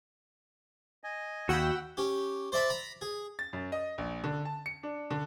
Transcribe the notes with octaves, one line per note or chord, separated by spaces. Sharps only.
D#5 G#5
D#2 F#4 F#5 G5 B5 E6
C#4 G4
C5 D5 E5 A5 B5
A#5 B5
G#4
A6
F#2
D#5
A#1
D3
A5
C#7
D4
D3